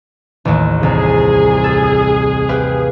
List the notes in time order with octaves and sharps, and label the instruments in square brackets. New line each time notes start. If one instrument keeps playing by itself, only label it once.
[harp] A1 D#2
[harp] C2 [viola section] G#4
[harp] A4
G4 B4 F5